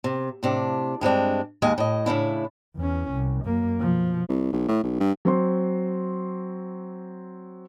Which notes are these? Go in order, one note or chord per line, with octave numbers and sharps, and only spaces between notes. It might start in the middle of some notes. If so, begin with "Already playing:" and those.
C3
A2 C3 D4
G2 G#3 C4 D4
D#2 G#3 D#5 G#5
A2 D#5
A2 C#3 D4 E4
E2 C#4
C2
F#2 A#3
B2 F3
C2
B1
A2
B1
G2
F#3 C4 C6